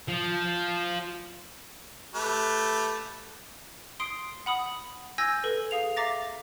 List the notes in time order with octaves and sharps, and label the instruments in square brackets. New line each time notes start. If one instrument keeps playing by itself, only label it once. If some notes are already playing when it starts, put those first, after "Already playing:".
[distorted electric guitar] F3
[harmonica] A3 G4 B4
[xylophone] C6 D#6 C7 D7
F#5 B5 D#6
G#5 E6 G6 G#6 A#6
A4 B4
G#4 F5 F7
E5 F5 A#5 D6 A6 A#6